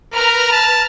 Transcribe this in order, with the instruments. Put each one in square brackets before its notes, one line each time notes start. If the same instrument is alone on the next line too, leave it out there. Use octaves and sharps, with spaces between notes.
[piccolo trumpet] A#4 [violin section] B4 A#5 F6
[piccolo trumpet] A5